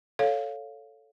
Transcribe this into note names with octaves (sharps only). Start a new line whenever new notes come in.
A4 C#5 F5